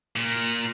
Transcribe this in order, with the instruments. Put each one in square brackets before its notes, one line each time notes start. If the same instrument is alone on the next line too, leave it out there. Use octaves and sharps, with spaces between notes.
[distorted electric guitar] A#2